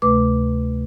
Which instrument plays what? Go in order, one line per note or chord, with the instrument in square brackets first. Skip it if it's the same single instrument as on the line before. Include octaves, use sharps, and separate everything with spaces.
[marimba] D2 C3 A3 B4 D6